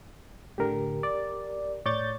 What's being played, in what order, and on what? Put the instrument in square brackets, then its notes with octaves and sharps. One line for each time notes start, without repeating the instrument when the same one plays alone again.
[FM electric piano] A2 D3 [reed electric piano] G4 A#4
[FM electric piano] D5
[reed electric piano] A2 C#5 C#6 [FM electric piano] D5 G6 A6